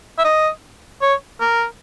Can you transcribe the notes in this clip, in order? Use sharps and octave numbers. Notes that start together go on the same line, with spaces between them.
E5
D#5
C#5
A#4